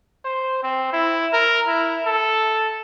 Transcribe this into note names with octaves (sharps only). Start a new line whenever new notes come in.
C5
C4
E4
A#4
E4
A4